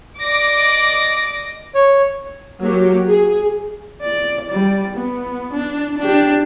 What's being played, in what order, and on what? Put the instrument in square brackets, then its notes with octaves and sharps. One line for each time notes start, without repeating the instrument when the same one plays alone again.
[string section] D5 D#5 D6 A#6
[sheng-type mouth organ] C#5
[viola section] F#3 A#3 G4
G#4
[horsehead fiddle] D5
G3 D5
B3
D4
D4 G4